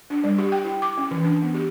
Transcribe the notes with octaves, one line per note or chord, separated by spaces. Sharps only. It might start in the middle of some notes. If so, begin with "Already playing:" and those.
D4
G3
G4
G5
E4
D6
C#4
E3
D4
B3
G4